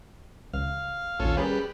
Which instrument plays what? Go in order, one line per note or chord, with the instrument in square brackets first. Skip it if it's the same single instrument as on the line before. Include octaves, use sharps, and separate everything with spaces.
[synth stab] C#2 [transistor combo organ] F5
[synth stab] A#1 D#2 [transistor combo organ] C#4 F4 A4
[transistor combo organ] G3 B4 [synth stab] C#4 G#4 A#4